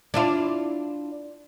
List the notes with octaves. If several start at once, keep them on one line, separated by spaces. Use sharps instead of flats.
D4 E4 F4